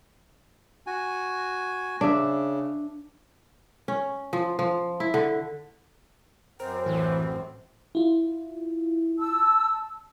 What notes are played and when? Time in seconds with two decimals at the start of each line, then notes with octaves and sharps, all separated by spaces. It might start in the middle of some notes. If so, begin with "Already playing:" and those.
0.87 F#4 G#5
2.01 C#3 D4 E5
3.88 C#4
4.33 F3
4.59 F3
5.00 E4
5.14 D3
6.60 F#2 C4 A#4 C5
6.86 A1 A2 E3
7.95 E4 F4
9.19 A5 E6